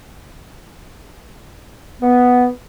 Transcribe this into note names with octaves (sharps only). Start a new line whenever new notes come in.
B3